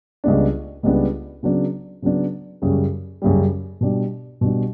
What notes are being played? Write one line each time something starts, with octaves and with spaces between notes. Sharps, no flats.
C#2 C#3 G3 B3 D4
C#2 C#3 G3 B3 D4
C#3 F#3 B3 D4
C#3 F#3 B3 D4
F#2 C#3 G3
F#2 C#3 G3
B2 G3 D4
B2 G3 D4